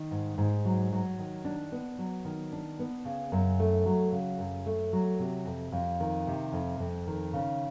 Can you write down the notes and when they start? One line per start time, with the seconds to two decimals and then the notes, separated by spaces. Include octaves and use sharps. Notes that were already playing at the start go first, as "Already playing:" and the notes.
Already playing: D#3
0.11 G#2
0.38 G#2
0.65 F#3
0.92 F#3
1.19 D#3
1.45 D4
1.72 B3
1.98 F#3
2.25 D#3
2.52 D4
2.79 B3
3.05 C#3
3.32 F#2
3.59 A3
3.86 F#3
4.12 C#3
4.39 F#2
4.66 A3
4.93 F#3
5.19 C3
5.45 F2
5.72 F2
6.00 D#3
6.27 C3
6.52 F2
6.79 F2
7.07 D#3
7.33 C#3